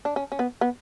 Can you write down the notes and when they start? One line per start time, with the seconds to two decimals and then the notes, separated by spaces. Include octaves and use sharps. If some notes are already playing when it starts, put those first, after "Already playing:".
0.05 D4
0.16 C#4
0.32 C#4
0.39 B3
0.61 B3